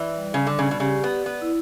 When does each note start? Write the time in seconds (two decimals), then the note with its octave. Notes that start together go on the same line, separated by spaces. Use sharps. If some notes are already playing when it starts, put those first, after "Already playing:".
Already playing: E3 D5
0.18 G3
0.34 C#3
0.47 D3 D5
0.59 C#3
0.71 B2
0.80 C#3 G4
1.04 B3
1.11 D5
1.26 B3
1.42 E4